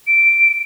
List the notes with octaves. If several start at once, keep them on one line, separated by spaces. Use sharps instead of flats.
D7